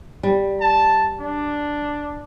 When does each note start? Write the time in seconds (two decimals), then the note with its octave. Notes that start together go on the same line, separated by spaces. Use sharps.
0.23 G3
0.61 A5
1.20 D4